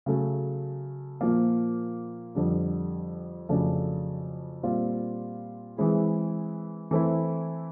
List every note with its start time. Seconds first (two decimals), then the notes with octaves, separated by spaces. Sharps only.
0.06 C#3 F#3 A3
1.21 A#2 F3 A#3
2.35 F2 D3 G3
3.49 F2 C#3 F#3 A3 D4
4.63 A#2 G3 C4 F4
5.77 E3 G#3 C4 E4 G#4
6.91 E3 A3 C4 E4